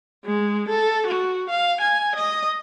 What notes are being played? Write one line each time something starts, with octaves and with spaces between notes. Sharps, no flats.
G#3
A4
F#4
F5
G#5
D#5